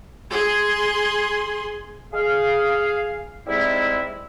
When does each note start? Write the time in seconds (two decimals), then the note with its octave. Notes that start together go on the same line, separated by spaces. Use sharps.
0.31 G#4 C6
2.13 G#4 F5
3.47 G#2 G3 G#3 C4 E4